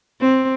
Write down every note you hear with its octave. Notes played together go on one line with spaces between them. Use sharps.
C4